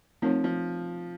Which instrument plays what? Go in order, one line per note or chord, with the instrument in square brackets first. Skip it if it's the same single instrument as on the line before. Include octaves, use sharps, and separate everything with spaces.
[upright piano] F3 [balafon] A3 C4 D#4 A#4 C#5
[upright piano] F3